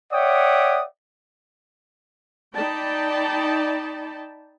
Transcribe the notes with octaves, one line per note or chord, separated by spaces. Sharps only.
C#5 D5 E5 F#5 G5 D#6
D#4 D5 G5 A5 B5